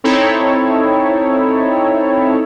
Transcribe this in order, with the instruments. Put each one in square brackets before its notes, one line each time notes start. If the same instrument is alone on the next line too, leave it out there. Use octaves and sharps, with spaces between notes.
[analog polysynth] C4 D#4 E4 A4 C#5